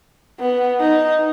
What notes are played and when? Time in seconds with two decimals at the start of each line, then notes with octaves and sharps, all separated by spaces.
0.39 B3
0.80 D#4